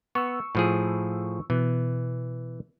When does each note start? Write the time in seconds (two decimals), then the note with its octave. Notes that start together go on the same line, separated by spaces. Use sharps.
0.15 B3 C#6 E6
0.55 A2 F3 G#4
1.50 B2 E3